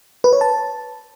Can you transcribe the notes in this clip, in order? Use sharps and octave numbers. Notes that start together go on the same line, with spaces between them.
B4
C#5
A5